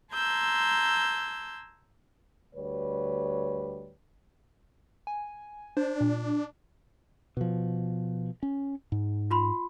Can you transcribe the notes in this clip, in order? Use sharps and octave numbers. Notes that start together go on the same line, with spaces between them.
A5 A#5 C6 E6 G6 G#6
D2 G3 B4 C#5
G#5
D4 C5
A#2
B2 F3
C#4
G#2
F4 B5 C6